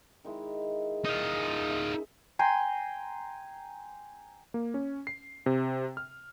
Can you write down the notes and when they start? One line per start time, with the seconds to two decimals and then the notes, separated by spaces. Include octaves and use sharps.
0.25 D#3 G#3 E4
1.05 D#4 F4
1.35 G#4
1.70 E5
2.39 G5 G#5 A#5 C6
4.54 A#3
4.74 C#4
5.07 C7
5.46 C3
5.97 F6